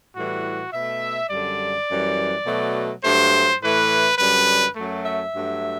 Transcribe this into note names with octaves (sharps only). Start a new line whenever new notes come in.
A2 E3 G3 F#4
B2 A3 E5
F#2 D3 G3 D5
F#2 E3 G3
B2 F#3 A3
G2 F#3 A3 C5
A2 E3 A3 B4
F#2 D3 G3 B4
F#2 F#3 A3
E5
G2 F#3 A3